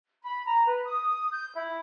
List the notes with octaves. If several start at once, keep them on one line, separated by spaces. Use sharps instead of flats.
B5
A#5
B4
D#6
G6
E4